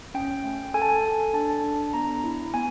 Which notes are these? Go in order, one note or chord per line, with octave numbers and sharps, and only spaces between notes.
C#4 G5
A3
A4 G#5
A5
G#5
A4
D4 A5
D4
B3 A#5
E4
B3 G#5